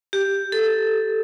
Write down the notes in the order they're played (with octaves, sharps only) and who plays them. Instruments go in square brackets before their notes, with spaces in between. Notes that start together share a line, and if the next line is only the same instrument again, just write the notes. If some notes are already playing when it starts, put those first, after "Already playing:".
[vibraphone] G4
A4